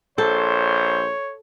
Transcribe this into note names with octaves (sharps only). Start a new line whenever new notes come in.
A#1 A4 C5 C#5